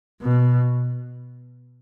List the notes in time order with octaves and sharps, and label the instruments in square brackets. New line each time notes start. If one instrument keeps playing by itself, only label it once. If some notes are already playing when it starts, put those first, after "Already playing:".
[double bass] B2